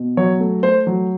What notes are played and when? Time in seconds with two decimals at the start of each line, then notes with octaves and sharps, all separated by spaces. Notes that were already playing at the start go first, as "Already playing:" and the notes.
Already playing: B2
0.17 F#3 C#5
0.40 A3
0.63 A3 C5
0.87 F#3